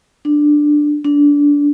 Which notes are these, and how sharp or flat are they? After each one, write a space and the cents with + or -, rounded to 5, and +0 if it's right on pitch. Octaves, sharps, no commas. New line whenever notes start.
D4 +10
D4 -20